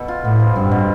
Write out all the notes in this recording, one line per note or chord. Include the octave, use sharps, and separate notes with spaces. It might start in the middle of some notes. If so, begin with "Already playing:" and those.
Already playing: B2 A4
F4
A2 B3
F3
G2 C4
B2